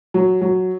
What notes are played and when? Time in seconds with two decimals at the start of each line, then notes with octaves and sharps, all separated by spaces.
0.14 F#3
0.41 F#3